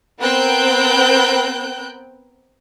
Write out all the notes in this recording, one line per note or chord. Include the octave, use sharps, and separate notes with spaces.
B3 C4 A#4 G5 F#6 G6